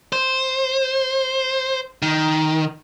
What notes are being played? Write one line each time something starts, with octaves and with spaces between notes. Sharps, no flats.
C5
D#3